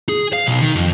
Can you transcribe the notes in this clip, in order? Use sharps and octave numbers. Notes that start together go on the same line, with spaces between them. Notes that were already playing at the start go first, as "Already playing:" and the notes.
G#4
F5
B1
D#3
F2